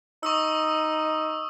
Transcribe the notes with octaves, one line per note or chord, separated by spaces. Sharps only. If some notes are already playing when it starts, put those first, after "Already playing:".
D#4 C#6 D#6 E6